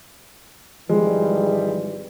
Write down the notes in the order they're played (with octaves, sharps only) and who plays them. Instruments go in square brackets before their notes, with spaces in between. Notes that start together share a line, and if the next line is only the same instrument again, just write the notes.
[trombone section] G#1 E3 G3 [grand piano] F3 G#3